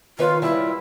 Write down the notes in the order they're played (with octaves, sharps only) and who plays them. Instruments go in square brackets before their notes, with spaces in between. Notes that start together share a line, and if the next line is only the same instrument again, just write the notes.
[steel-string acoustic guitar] D#3 B4 C#5 [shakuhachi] F4
[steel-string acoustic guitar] G3 G5 A5 [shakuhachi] E4